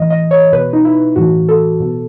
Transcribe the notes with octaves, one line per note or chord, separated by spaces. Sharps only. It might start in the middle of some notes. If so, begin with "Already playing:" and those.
Already playing: A2 E3 D#5
D#5
C#5
B2 B4
D#4
E4
A2 E3 F#4
A4
B2